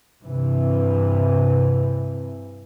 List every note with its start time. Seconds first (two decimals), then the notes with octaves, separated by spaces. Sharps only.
0.23 G2 C3 E3